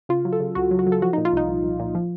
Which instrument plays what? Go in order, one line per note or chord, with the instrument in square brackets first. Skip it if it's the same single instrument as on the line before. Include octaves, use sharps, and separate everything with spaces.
[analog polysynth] C#3 F4
F#3
A4
C#3
C#2 F#4
F#3
F#4
F#3
A4
F3 F#4
D#4
A#2
F4
C2 D#4
C2
C2
A#2
F3